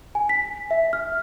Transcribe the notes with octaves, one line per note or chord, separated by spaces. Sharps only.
G#5
B6
E5
F6